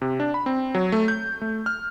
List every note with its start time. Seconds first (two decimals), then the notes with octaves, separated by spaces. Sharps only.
0.02 C3
0.20 D4
0.34 B5
0.46 C4
0.75 F#3
0.92 A3
1.08 G6
1.41 A3
1.66 F6